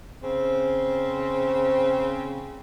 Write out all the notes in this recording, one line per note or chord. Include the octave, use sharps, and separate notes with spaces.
C#3 C4